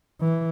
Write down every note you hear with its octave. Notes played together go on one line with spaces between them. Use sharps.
E3